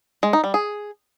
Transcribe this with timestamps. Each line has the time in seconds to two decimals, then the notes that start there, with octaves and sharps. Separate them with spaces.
0.23 G#3
0.33 D#4
0.44 G3
0.54 G#4